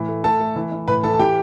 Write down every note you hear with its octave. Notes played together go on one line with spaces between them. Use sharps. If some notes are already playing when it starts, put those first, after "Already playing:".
Already playing: A2 E3
A3
A3 A4 A5
A3
E3
E3
A2 B4 B5
E3 A4 A5
A5
E3 G4 G5